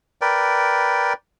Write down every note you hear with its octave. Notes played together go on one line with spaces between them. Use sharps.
A#4 B4 D5 G5